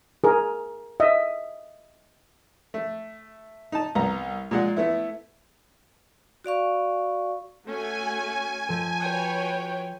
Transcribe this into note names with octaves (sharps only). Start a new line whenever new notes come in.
G#4 A#4
D#5 E5
A3
D#4 A5
C2 B3 A#5
A#2 G#3 F#5
A3 B3 E4
F#4 D5 F5 C#6
A3 C#4 F#4 G#5
F3 A4
F#4 B4 C#5 G5